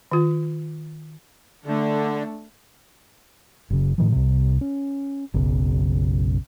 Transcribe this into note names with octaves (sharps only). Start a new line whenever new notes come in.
D#3 F4
D3 A3 D4
F#1 C#3
A2 D#3 F3
C2 C3
C#4
F#1 B1 C#3